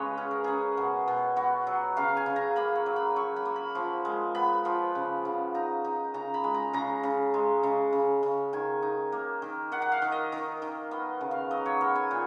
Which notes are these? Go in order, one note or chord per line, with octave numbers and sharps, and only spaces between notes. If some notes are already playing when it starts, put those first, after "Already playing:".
Already playing: C#3 G#3 B4 C#5 D#5
C#4 G#4
A#4
C#4 G#4
B2 F#4
B2
B3 F#4
F#3
C#3 F5
G#5
C#3
A#5
A#3 B5
C#6
F#3
B5
F#3 C#6
B5
A#3
B5
F3
G#3
B3 B5
F3
C#3
C#3
D#4 A#5
D#4
C#3 A#5
B5
G#3
A#5
C#3 A#5
C#3
G#3
C#3
C#3
C#3
D#3 G#5
D#4
A#3
D#3
D#3 F#5
F#5
F5
D#3
D#5
D#3
D#3
B3 D#5
C#3
F5
F#3 D#5
C#5
B3 A#4
G#5
A#2